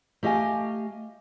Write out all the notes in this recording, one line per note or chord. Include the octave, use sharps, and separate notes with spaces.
A3 G4 D#5 F5 G#5